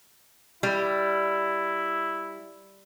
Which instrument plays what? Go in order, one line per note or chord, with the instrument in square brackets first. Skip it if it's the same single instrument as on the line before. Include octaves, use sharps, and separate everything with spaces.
[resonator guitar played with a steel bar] G3 [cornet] E4